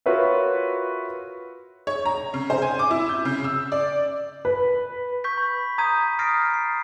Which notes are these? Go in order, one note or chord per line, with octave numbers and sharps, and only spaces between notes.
F4 F#4 A#4 B4 C#5 E5
C#5
A#5
C#3
C5
G#5
D6
E4
G6
C#3
E6
D5
B4
C#6 G6 B6
B5
A#5 D#6 G6 G#6 B6 D#7
D#6 F6 A6 A#6 C7 D7
C7